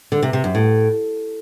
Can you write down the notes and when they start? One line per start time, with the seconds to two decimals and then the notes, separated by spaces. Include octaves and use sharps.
0.12 D3
0.23 C3
0.33 C3
0.44 F#2
0.55 A2